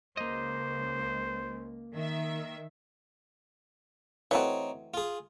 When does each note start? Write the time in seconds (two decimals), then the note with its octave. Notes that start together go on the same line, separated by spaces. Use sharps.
0.17 C#2 A#3 C5 D#5
1.94 D#3 E5
4.31 E3 A3 C4 D#4 F#4 C#5
4.94 F4 G#4